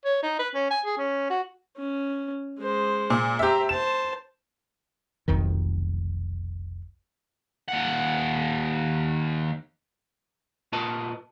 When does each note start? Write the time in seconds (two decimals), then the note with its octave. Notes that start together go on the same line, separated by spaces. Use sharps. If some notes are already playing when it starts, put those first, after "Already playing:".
0.05 C#5
0.23 D#4
0.39 B4
0.54 C#4
0.71 G#5
0.85 G#4
0.98 C#4
1.30 F#4
1.77 C#4
2.59 G#3 C5
3.10 A#2
3.39 G4 C5 E5 A#5
3.69 C5 A5 E7
5.28 F1 B1 F2 D#3
7.68 D#2 F#5
10.72 A#2 F4 A#4 B4 D#5 A5